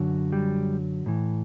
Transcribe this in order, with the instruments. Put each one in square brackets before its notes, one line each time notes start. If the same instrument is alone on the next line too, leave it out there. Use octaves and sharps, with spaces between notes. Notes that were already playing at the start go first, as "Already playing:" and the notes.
Already playing: [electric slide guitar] F#2 D3 F#3
G3
A2 E3